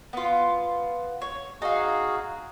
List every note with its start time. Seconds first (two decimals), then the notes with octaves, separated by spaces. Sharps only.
0.13 B3 F4
1.22 C#5
1.62 D#4 F#4 G#4 F5